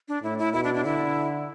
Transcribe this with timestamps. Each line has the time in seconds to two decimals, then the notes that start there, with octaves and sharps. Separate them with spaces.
0.08 D4
0.23 A2 E4
0.39 E4
0.53 B2 E4
0.64 D4
0.74 D4
0.85 D3 E4